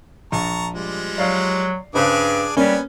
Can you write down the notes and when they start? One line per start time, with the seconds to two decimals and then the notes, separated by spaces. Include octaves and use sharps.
0.32 A#1 A5 A#5 C#6
0.74 F3 G3 G#3
1.18 F#3 D5 F5
1.95 G2 C#3 D4 G#4 C5 D6 F#6
2.57 G3 A#3 B3 C#4 B4 G#5